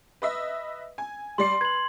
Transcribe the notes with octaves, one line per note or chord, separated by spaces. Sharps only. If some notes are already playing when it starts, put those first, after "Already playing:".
B4 D#5 E5
G#5
G3 D5 C6 C7
B4 G#6 F#7